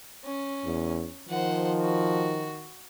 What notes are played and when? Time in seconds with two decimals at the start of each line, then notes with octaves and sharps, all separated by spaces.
0.24 C#4
0.65 E2
1.29 D#3 F3 C5 F#5
1.81 F#4